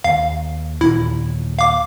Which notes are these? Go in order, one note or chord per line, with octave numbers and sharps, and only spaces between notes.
D#2 F5
D#2 A#2 E3 E4
F5 D6